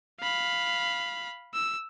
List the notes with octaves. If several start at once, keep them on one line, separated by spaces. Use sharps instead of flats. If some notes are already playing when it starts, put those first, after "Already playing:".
F5 B5
E6